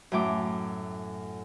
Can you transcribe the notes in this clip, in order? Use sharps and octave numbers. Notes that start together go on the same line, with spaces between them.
F#2 A2 A3 G5 D6